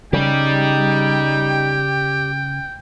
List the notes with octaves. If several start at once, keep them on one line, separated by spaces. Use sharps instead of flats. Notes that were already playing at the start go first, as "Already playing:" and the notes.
C#3 D#4 G4 D5 G5